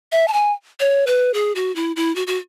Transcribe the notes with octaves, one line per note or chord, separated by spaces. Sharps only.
E5
A5
G#5
C#5
B4
G#4
F#4
E4
E4
F#4
F#4